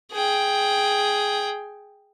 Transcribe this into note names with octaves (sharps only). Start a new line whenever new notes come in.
G#4 G5